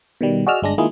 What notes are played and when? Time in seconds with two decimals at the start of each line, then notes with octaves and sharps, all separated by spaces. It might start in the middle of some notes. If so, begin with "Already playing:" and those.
0.21 B2 D#3 G3
0.47 F#4 G#4 D5 D#5 E6 F6
0.62 G1 G#3 D4 A#6
0.78 D#3 G#3 A#3 E4 F4 G#4